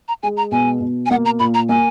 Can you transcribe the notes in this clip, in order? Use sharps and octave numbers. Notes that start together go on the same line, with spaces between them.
A#5
G#3 G#5
A#5
B2 G#5
B2
G#5
A#3 F#5
A#5
A#2 B5
A#5
A#3 G#5